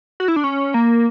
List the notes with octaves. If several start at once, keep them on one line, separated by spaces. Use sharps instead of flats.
F#4
E4
D4
C#4
A#3